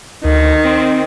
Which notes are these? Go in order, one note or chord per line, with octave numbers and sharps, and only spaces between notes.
D2 D#3
C4